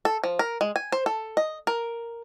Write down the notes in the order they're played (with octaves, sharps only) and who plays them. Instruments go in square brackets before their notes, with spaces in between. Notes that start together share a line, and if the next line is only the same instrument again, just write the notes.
[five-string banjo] A4
F3
A#4
G#3
G#5
C5
A4
D#5
A#4